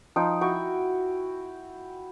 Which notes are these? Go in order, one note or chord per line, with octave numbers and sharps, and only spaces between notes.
F3 D#4 G5
E4 F#4 G5 C#6